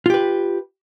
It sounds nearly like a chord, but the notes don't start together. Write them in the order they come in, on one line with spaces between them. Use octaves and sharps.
F4 G4 B4